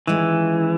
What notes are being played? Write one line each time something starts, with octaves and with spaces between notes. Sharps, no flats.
G#2 D#3 E3 G#3 C#4 F4